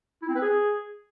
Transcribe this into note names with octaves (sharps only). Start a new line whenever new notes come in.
E4
C4
B4
G#4